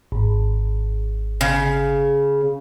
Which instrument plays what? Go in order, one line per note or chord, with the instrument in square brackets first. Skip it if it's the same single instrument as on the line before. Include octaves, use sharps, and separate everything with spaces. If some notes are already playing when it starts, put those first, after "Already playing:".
[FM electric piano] G#1
[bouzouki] C#3